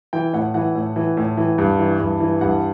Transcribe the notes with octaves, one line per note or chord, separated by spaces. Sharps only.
E3 G5
A2 F#5
E3 F#5
A2
E3
A2
E3
G2
E3
G2
E3
G2 F#5